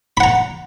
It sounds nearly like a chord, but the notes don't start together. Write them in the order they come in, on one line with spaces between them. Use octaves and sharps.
B5 F#5 A#5